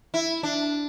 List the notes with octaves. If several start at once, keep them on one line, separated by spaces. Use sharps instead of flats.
E4
D4